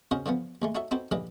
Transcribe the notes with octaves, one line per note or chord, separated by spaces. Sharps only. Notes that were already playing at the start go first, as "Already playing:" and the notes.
C#3 C#4 F#4 A#4 C5 D#5
D3 E3 F3 B3
D#2 G#3 A3
D#4 F#4 A4 C#5 E5
C4 D#4 F#4 A4 B4 C5
A#1 D3 E3 G3 B4 D#5